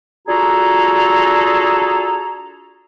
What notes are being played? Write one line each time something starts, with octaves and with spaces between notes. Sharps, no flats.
D4 F4 F#4 G#4 A4 A#5